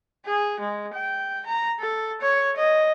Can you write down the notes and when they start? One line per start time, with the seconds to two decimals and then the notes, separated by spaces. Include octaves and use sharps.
0.25 G#4
0.60 G#3
0.94 G5
1.46 A#5
1.80 A4
2.21 C#5
2.57 D#5